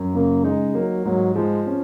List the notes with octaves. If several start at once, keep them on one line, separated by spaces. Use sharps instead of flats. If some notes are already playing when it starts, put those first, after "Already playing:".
Already playing: F#2
C#3 A#3
G#3 D#4
F#3 A#3
G#2 F#3
F3 G#3
C#4